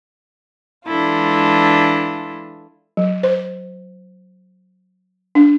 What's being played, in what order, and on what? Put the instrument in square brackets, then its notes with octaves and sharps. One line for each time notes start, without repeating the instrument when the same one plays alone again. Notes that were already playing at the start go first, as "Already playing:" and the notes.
[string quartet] E3 G#3 D4 E4 F4 A4
[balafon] F#3
C5
D4